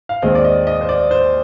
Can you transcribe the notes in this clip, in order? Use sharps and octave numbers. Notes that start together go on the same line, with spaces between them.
F5
D#2 D#3 G#3 C4 D#5
D5
D#5
D#5
C5
D5
C5